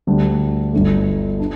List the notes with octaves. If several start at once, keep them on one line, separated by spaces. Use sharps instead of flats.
D2 D3 G3 D4
G1 G2 D3 A3
D4